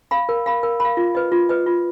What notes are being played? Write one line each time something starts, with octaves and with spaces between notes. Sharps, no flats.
F5 B5
A#4
F5 B5
A#4
F5 B5
F4
B4 D#5
F4
B4 D#5
F4